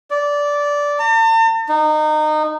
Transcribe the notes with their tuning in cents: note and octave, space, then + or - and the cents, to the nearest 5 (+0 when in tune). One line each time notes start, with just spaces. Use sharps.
D5 -15
A5 +45
D#4 -25